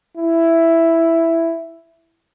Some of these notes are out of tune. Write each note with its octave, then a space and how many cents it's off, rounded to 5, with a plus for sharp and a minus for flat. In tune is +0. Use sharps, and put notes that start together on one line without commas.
E4 +5